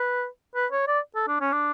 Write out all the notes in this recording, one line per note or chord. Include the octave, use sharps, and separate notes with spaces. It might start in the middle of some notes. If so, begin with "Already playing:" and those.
Already playing: B4
B4
C#5
D5
A4
D4
C#4
D4